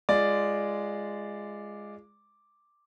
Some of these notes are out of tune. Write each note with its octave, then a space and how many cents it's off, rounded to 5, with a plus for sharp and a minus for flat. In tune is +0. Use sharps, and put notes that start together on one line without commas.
G#3 -5 F4 -25 D5 +0